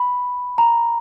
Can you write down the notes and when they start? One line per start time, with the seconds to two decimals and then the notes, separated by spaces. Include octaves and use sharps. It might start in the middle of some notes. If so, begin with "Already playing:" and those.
Already playing: B5
0.58 A#5